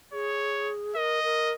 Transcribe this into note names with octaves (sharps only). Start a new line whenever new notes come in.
G#4 C#5
A#4 D#5
A#4